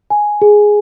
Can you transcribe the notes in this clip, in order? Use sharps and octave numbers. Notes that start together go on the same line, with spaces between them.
G#5
G#4